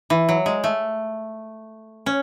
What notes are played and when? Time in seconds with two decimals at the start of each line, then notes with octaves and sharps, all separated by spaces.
0.10 E3
0.29 F#3
0.46 G#3
0.64 A3
2.06 C#4